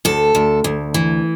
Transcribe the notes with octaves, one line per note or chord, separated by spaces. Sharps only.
D2 A4
D2
D2
E3